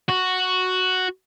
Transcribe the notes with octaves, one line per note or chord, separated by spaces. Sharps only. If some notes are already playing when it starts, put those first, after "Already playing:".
F#4